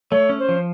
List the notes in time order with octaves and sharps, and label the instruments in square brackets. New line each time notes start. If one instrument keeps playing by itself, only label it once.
[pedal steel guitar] A3 [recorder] C#5
[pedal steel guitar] C#4
[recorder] C5
[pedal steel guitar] F3